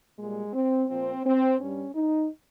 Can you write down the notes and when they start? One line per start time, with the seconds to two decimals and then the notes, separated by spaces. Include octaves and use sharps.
0.18 A#2 G3 G#3
0.53 C4
0.89 A#2 F3 C4
1.25 C4
1.60 G2 G3 C#4
1.95 D#4